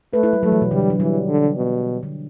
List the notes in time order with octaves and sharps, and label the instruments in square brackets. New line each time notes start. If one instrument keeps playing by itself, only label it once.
[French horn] A3 [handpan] B4
[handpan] E4
G3
[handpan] F#3 [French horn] A3
[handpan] E3
B2
[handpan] D3 [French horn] G3
[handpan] E3
F#3
[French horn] E3 [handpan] G3
[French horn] D3
B2
[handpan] D3